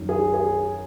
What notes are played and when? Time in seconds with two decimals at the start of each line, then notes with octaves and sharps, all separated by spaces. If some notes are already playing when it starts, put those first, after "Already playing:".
Already playing: F#2 D#3
0.09 G#4
0.34 G#4